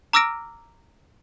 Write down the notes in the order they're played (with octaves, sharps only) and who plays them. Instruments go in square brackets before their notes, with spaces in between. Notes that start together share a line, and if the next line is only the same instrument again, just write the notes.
[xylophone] A#5 D6 E6 F6 A#6 D7